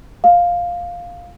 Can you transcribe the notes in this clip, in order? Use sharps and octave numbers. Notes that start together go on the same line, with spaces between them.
F5